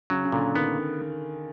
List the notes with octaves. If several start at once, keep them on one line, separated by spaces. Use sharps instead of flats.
C#3 F#3
C#3
A#2 D3
D#3 B3